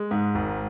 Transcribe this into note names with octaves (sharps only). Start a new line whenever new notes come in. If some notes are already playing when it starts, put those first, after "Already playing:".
Already playing: G#3
G#2
G#1